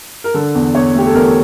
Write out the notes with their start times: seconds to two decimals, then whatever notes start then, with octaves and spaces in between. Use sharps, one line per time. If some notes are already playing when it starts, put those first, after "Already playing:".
0.24 A#4
0.34 D3 A4
0.55 E2
0.75 E2 C#5
0.95 A3 G4
1.07 A4
1.15 E2 A#4